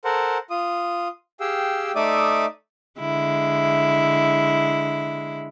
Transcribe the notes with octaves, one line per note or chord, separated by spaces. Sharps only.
A4 A#4 C5 F#5
F4 D#6
G4 G#4 F5 G5 E6
A3 D#4 D5 E5 D6 D#6
D3 G#3 E4